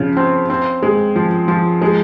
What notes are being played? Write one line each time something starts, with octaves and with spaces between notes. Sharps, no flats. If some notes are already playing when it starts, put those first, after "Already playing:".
Already playing: C#3 F3
C4
C4
G#3
F3
F3
G#3